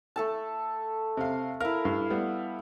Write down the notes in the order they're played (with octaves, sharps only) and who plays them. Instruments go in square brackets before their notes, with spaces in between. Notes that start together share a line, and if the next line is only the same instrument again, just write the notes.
[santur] A3 A4 A5
[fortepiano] C3 F5
[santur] E4 F5 [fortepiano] A#4
[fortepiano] G2
G3 B3